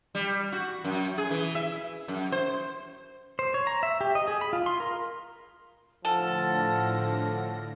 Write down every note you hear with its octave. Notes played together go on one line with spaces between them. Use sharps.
G3
F#4
F#2
G#4
E3
E5
F#2
C5
C5
C#5
A#5
E5
G4
D#5
G#4
B5
F4
C6
A#4
A2 D3 F3 A4 F#5 A5 F6 A#6